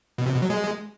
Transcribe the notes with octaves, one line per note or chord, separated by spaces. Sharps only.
B2
C3
B2
F#3
G#3